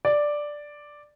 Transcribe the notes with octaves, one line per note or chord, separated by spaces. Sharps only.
D5